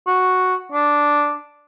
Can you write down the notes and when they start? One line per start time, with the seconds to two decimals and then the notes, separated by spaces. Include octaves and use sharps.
0.07 F#4
0.72 D4